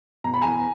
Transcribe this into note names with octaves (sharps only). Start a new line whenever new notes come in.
B2 A#5
B5
E2 G#5 A#5